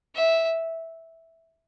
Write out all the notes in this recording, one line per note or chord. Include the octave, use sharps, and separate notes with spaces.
E5